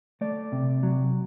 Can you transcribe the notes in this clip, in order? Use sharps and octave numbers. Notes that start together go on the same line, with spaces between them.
A3 D5
C3
F#3